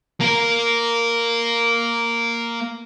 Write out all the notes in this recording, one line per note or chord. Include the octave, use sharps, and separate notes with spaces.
A#3 A#4